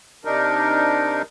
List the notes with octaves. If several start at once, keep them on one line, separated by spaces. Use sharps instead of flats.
C3 D4 D#4 A#4